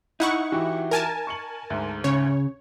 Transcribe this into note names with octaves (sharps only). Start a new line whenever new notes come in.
D#4 E4 F#5 C#6
E3 F#4 G4
A#4 G#5 A5
C#6 C#7 F#7
D2 G#2
C#3 C#5